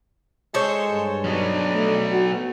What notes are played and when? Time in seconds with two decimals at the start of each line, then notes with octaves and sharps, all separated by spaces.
0.54 G#3 A4 C5 C#5
0.91 G2
1.25 F#3 B3 D4
1.72 A3
2.11 F#4